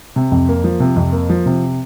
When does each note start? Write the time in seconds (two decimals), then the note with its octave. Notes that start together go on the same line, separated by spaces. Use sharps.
0.16 C3
0.32 F2
0.49 A#3
0.64 F3
0.80 C3
0.96 F2
1.13 A#3
1.30 F3
1.46 C3